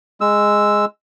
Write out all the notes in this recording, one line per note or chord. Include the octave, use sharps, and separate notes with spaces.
G#3 E6